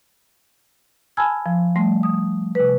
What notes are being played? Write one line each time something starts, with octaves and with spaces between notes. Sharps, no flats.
G#5 A5 B5 E6 F6 G#6
F3
G3 A3 C6
D#6
C3 B4